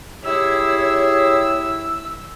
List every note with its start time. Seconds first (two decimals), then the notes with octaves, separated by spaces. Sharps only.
0.25 E4 G4 G#4 C#5 E6